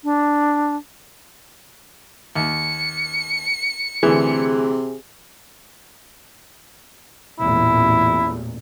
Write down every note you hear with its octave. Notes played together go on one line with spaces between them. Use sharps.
D4
D#2 C#7
D2 C3 E3 G#4
A1 E2 A#2 E4